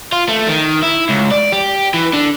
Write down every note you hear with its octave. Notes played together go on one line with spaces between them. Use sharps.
F4
A3
D#3
E4
C#2
D5
G4
E3
D3